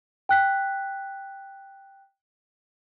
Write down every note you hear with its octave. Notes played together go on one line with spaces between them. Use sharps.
G5 F#6 B6